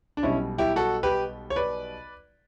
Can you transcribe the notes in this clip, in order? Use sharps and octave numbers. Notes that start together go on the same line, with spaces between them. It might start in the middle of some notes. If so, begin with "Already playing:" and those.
D4
B1 B2 G3 C#4 E4
E4 G4
F#4 A4
G4 B4
C#5
B4 D5